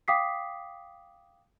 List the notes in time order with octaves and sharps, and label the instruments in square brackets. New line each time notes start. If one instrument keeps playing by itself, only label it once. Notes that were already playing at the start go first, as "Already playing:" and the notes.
[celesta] F5 G5 D6 D#6 B6 C7